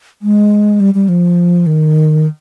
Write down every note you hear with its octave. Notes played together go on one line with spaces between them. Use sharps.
G#3
G3
G3
F3
D#3